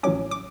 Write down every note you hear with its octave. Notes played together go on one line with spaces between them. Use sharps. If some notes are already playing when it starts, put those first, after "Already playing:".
A1 A2 F#3 C#4 D6
D6